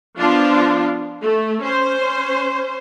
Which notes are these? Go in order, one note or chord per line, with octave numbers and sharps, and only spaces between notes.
F3 B3 D4 F4
A3
C#4 C5